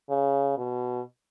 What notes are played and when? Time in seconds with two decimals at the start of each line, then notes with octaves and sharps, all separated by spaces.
0.10 C#3
0.57 B2